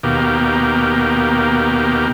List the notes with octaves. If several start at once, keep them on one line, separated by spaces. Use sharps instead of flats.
D#2 B2 A#3 G4